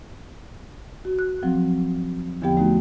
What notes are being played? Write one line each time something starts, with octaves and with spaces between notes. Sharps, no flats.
F#4
F#6
F3 F#3 C4
E2 D3 F3 B3 G4 G5
A3 D#4 F#4